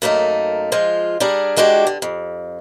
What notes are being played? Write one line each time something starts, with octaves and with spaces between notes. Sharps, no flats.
F#2 A3 A#3 D#4
F3 G#3 F4
G3 D4 G#4 A#4
E3 G#3 D4 F#4 G4
D3
F2